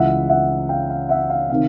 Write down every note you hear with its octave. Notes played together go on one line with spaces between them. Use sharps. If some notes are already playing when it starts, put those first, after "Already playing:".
Already playing: C#2 C#3 E3 E5 F#5
E5 F#5
F5 G5
F5
E5 F#5
F5
C3 D#3 F5